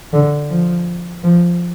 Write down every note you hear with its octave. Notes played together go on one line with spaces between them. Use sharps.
D3
F3
F3